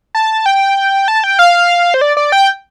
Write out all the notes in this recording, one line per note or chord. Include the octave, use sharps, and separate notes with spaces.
A5
G5
A5
G5
F5
C5
D5
D5
G5